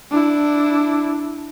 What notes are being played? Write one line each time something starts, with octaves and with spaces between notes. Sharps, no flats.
D4 E4